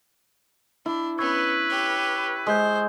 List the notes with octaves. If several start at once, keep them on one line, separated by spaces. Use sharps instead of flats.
D4 E4
B3 C#4 B4 C#6 E6 G#6
G4 C#5
G#3 C5 D#6 G6